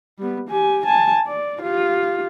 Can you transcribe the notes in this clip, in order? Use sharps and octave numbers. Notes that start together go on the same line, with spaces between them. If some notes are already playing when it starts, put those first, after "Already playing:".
G3 B3
G4 G#5
G#5 A5
D5
F4 G4